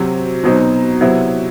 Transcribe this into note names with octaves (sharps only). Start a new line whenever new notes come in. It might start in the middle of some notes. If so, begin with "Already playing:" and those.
Already playing: C3 F#3 C4
B2 F#3 C4 D#4
C3 F#3 B3 E4